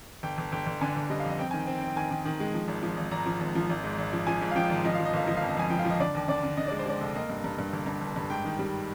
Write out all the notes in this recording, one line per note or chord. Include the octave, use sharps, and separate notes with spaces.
G1 G5
G1
G1 G5
G1
D3 G#5
G1
G3 D#5
F5
F2 D#5
C4 G5
G#5
D#3 G5
C4
G5
C4
D#3 G#5
D#3
D#3
G#3
F3
G#1
F3
G#1
G#1 A#5
F3
G#1
F3
G#1
G#2
G#1
F3
F3 G#5
G#2
F5
F3 G5
G#1
F3 D#5
F3 F5
D#5
G1 F5
F3 D#5
F5
F2
D#5
F2 G#5
F3 G5
F5
F3 D#5
D3 D5
D#2
D3 D5
D3
D3 D#5
G#3 D5
C5
G#3 D5
F1
A#3 D#5
G2
G2
G2
G1
G2
G1
G2
G#2 G5
D#3
G3